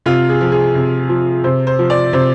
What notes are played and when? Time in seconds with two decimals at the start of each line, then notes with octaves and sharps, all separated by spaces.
0.06 C3 F4
0.29 G#4
0.41 F3
0.52 G#4
0.75 C3
1.09 F3
1.44 C3 C5
1.67 C5
1.79 F3
1.90 D5
2.13 C3 C5